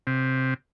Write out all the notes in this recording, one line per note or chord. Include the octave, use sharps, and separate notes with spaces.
C3